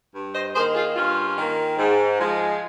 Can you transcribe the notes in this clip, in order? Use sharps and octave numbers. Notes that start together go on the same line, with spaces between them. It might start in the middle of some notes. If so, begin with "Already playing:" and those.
G2
C5 D#5
D#3 A#3 G#4 C5
F4 G#4
G2 C#4 F4
D#3 A#3
G#2
F3 G#3